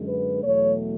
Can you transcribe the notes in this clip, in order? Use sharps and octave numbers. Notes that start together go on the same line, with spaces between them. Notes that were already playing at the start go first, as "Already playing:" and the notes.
Already playing: F#2 D3 G#3
B4
E2 B2 F#3 A3 C#5